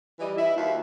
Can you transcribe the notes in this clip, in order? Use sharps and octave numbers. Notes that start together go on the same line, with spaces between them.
E3 G3 E4 D#5
E4 E5
D#2 F4 F#4 E5